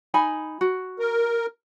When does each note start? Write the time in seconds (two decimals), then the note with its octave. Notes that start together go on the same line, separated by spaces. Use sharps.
0.14 D#4 G#5 B5
0.61 F#4
0.99 A#4